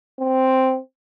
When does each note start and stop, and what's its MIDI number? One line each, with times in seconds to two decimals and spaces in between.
0.20 0.80 60